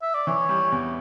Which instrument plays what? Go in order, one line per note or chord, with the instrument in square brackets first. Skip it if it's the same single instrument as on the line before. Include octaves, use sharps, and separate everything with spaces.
[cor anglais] E5
D5
[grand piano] E3 [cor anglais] C#5
[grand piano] G3
E2